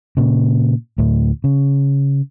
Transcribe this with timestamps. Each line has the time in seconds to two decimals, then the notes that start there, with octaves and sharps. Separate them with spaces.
0.17 A#2 C#3
0.98 D2 A2
1.44 C#3